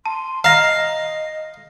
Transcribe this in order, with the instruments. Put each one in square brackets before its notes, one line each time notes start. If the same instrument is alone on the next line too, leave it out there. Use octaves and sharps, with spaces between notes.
[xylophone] A5 [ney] C6
[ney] D#5 [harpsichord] F5 [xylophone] A#5 A#6